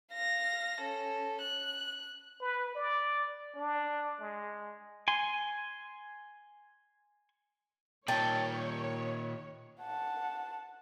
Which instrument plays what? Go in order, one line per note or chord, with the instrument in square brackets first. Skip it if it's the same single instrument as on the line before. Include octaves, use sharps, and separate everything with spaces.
[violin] F5 A#6
C#4 A4
F#6
[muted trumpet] B4
D5
D4
G#3
[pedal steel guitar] G#5 C6
[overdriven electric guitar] A#2 D#3 [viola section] C#5 [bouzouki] G5 [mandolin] A5
[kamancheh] F#5 A5